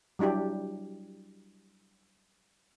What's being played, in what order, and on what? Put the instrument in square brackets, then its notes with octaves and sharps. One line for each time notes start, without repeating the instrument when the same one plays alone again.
[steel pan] F#3 G3 D4 E4 G4